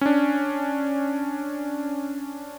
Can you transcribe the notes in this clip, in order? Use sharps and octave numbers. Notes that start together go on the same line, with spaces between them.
C#4 D4